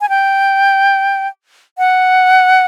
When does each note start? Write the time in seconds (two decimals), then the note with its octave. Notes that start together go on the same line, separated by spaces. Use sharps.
0.01 G#5
0.09 G5
1.78 F#5